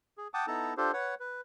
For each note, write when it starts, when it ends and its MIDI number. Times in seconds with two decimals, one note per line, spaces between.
0.18 0.28 68
0.34 0.46 78
0.34 0.46 79
0.34 0.46 81
0.34 0.46 86
0.34 0.46 87
0.47 0.74 59
0.47 0.74 63
0.47 0.74 64
0.47 0.74 69
0.47 0.74 81
0.47 0.74 82
0.77 0.92 62
0.77 0.92 65
0.77 0.92 67
0.77 0.92 69
0.77 0.92 72
0.93 1.15 71
0.93 1.15 73
0.93 1.15 78
1.20 1.41 71